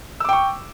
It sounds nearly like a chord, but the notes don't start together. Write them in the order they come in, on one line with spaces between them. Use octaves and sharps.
E6 D6 G5 C#6